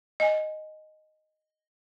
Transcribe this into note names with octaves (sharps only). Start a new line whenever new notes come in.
D#5 G#5